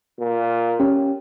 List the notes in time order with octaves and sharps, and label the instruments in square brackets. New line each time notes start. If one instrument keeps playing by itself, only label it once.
[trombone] A#2
[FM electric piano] C#4 G4